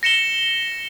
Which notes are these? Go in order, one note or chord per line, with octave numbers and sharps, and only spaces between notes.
A#6 C#7 E7 G7